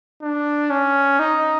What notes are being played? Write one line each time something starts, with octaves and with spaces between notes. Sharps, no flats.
D4
C#4
D#4